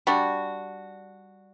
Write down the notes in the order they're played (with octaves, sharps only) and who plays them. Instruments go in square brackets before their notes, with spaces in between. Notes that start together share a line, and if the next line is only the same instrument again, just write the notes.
[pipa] G3 D4 F#4